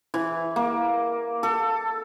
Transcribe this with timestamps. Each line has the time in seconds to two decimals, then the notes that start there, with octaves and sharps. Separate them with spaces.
0.14 E3
0.56 A#3
1.43 A4